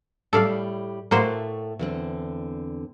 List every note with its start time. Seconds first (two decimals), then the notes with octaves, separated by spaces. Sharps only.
0.33 A2 G3 A4 D5 F5
1.11 A2 A3 A#3 F#4 C5
1.79 E2 D3 C4